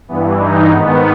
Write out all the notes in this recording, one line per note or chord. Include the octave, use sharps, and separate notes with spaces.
G2 E3 B3
D#4
G#2 D#3 B3